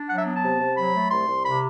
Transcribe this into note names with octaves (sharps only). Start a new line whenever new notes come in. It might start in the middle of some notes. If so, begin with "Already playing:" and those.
Already playing: D4
F#3 F#5
E5
B3
A5
C3
C3
F#3 B5
A3
C2 C6
C2
C3 B5